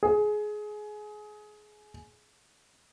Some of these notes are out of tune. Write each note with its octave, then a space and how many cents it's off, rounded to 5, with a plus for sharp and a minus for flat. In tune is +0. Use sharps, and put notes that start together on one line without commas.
G#4 +20